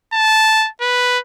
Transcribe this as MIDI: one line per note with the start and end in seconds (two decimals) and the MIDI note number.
0.13 0.68 81
0.81 1.19 71